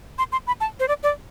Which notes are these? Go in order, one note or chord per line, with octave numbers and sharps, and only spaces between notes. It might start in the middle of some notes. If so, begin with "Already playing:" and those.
C6
C6
B5
A5
C5
D5
D5